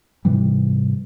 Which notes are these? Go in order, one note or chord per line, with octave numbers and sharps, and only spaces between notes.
G#2 C3 E3 G3